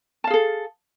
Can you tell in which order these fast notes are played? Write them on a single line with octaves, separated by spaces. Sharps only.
A5 F5 G#4 A4